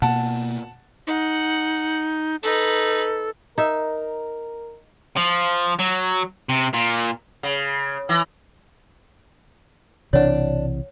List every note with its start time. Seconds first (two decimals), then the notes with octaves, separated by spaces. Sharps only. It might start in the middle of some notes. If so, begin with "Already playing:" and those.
0.02 B2 A#3 F#5 A5
1.07 D#4 F#5
2.43 D#4 A4 B4
3.58 D#4 A#4 E5
5.17 F3
5.79 F#3
6.49 C3
6.74 A#2
7.43 C#3
8.09 E3
10.13 B1 C3 E3 D4 C#5 D5 F#5